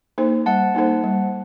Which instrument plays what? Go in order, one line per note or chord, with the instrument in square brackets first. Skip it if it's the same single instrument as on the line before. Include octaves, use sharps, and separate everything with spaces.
[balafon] A#3 D#4 A4 C5
[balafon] G3 [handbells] F#5 A5
[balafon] A#3 D#4 A4 C5
G3